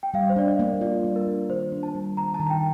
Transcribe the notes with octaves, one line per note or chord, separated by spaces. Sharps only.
G5
G3 F5
C5
D4 D5
D#5
A#3
F4 D5
G3
A#4
D4
D#3 C5
D4
A5
G3
D#3 A#5
A5
D#3
A5
G5